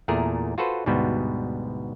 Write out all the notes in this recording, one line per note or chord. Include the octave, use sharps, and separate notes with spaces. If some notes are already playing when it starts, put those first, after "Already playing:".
E2 A#2 A3 G#4 A#4
F4 F#4 A4 B4 C5
D2 G#2 B2 G3 B3